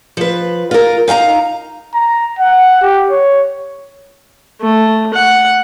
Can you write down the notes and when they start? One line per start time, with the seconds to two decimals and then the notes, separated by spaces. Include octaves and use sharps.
0.17 F3 B4
0.71 F4 A#4
1.08 D#4 F5 G5 A#5
1.94 A#5
2.39 F#5
2.82 G4
3.10 C#5
4.61 A3
5.14 F#5